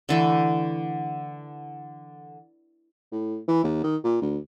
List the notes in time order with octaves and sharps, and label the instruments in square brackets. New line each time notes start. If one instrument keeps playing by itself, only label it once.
[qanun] D3 E3 A3
[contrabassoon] A2
E3
D#2
D#3
A#2
D2